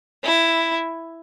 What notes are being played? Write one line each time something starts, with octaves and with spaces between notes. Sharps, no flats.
E4